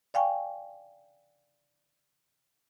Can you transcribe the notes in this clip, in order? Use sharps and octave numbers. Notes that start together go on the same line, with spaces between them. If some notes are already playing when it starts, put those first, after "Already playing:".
D5 F5 G5 G#5 C#6